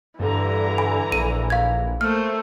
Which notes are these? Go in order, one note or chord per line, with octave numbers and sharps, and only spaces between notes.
G2 D3 E3 A#5
G#5 B5
A#1 D#7
F5 G#6
A3 A#3 C5 F6